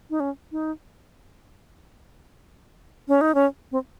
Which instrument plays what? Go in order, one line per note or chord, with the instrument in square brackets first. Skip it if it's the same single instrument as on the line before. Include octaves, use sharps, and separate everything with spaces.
[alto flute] D#4
C#4
D#4
C#4
D#4
C#4
C4